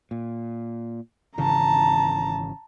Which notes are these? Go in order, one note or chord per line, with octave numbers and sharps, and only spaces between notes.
A#2
G#1 C#3 E3 A5 A#5